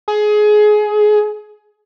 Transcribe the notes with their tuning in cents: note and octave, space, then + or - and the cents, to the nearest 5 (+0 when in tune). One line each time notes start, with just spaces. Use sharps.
G#4 +20